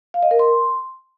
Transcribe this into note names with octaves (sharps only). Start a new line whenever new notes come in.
F5
D#5
A#4
C6